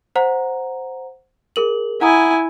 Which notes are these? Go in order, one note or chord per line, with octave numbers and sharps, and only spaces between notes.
C5 F#5 A#5
G#4 A#4 F#7
E4 F#5 G#5 A#5 D#6